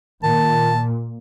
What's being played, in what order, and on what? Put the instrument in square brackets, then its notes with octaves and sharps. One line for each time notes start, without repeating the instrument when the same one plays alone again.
[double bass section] A#2 [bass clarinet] D#3 [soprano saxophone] A5